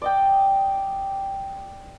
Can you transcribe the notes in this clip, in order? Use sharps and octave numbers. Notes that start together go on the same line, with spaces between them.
D5 D#5 G5